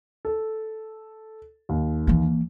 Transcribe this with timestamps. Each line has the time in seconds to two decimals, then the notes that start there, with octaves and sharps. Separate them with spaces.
0.25 A4
1.69 D#2
2.07 E3 A#3